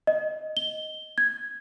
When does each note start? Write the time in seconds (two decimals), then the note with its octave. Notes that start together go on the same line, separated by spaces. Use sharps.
0.07 D#5
0.57 G7
1.18 G#6